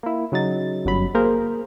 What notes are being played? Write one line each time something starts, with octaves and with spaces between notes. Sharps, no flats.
A#3 E4
C#3 F#3 D#4 A6
G1 F#2 F#3 B5
A#3 G#4 A#4 C5